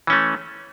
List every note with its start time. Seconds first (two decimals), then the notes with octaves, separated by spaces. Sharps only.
0.07 E3
0.10 C#4
0.13 A3